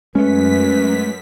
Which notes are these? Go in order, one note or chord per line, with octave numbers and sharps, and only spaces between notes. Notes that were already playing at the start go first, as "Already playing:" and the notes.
F#2 G#3 A3 C#4 B4 B6